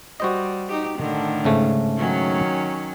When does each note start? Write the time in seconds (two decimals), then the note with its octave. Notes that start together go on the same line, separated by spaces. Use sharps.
0.20 G3 F#4 C5 D#5
0.68 D#4 G4
0.98 A2 D3 D#3
1.44 G#2 C#3 A3
1.98 D#3 F#3 C#4